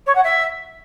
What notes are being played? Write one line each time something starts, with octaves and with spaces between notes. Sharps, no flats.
C#5
F#5
E5